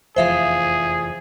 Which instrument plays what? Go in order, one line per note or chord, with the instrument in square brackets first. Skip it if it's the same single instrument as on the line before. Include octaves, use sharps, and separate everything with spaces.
[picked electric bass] F1 E2 F3 [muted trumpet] G#4 [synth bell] C5 E5 F5